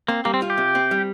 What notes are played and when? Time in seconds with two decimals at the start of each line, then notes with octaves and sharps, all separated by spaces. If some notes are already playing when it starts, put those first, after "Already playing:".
0.08 A#3 C4
0.25 G3 A#3
0.34 C4
0.42 F4
0.50 G4
0.58 C3
0.75 C4
0.91 G3